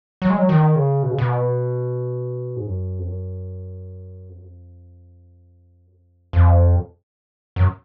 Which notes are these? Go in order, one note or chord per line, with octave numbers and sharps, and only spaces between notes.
F#3
G#3
F#3
D#3
C#3
B2
C#3
B2
G#2
F#2
F2
F#2
F2
F#2
F2
F#2
F2
F2
F#2